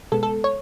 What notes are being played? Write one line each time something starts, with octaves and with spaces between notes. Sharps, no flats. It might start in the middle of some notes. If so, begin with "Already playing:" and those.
B2 G#3 B3 A4
A4
C#5